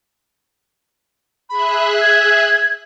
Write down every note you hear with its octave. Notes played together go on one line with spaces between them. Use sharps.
G#4 E5 B5 F#6
G#6